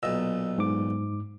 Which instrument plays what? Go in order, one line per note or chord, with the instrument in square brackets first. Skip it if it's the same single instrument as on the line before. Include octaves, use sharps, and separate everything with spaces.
[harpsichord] B1 A#2 [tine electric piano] D#5 E6
[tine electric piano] G#2 D6